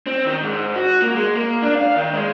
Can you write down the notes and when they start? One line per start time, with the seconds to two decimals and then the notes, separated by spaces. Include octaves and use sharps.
0.07 C4
0.26 D#3
0.42 G#2
0.75 F#4
1.02 A#3
1.15 G#3
1.36 A#3
1.63 D4
1.75 F5
1.96 D#3
2.13 G#3